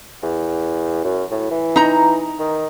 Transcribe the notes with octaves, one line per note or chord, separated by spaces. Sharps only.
E2
F#2
A2
E3
D#4 A#5
D#3